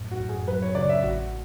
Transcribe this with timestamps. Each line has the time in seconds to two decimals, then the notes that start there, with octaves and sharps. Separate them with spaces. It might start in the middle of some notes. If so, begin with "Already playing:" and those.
Already playing: F#2 A2
0.11 F#4
0.20 F#2
0.29 G#4
0.48 F#3 B4
0.62 C#5
0.75 C#3 D5
0.89 E5
1.03 A1 F#4